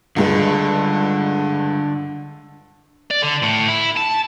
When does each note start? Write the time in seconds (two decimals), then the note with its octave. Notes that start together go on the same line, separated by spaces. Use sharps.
0.16 C#2 G2 D3 G#3
3.11 D5
3.22 D3
3.43 A2
3.68 E4
3.97 A5